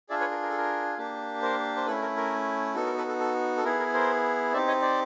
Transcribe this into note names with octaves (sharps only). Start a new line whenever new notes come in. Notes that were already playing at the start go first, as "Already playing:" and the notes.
D4 F4 G#4 D5 E5
B4 C#5
A#4
A#4
A4
A#4
A#3 D4 G4
A#4 C5
C5
A3 C#4 E4 A4 B4
A#4
A#4
B3 D#4 F#4 A4
A#4
A4 B4
A4
A4
A4
B3 E4 G#4 A#4
A#4
A#4 C5
C4 D#4 G4 D5 E5
C#5 D#5
C5 D5